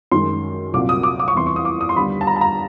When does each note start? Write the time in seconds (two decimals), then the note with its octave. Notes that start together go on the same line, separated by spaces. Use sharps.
0.12 F#2 D#3 G#3 C6
0.73 C2 A#2 F#3 A#3 D6
0.89 D#6
1.03 D6
1.20 D6
1.28 C#6
1.35 E2 C3 E3 C6
1.46 C#6
1.56 D#6
1.65 D6
1.81 D#6
1.89 C6
1.96 D#2 D3 G3 B3 B5
2.21 A5
2.27 A#5
2.36 A5
2.41 A#5